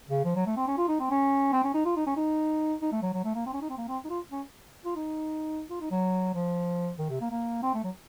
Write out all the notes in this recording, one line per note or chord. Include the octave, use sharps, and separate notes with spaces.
C#3
F3
F#3
A3
C4
C#4
F4
D#4
C4
C#4
C4
C#4
D#4
F4
D#4
C#4
D#4
D#4
A3
F#3
F#3
A3
A#3
C4
C#4
D#4
C4
A#3
C4
D#4
F4
C#4
F4
D#4
F4
D#4
F#3
F3
D#3
C3
A#3
A#3
C4
A3
F#3